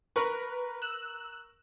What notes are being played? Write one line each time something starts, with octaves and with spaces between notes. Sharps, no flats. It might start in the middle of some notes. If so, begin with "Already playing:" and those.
A#4 B4 C#6
E6 F#6